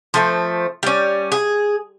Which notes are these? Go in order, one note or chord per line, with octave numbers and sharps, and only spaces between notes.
F3 A3 C4
G3 C#4
G#4